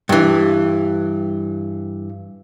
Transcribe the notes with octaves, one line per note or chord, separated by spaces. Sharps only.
G2 E3